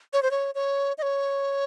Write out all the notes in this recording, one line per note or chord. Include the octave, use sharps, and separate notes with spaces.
C#5
C5
C#5
C#5
D#5
C#5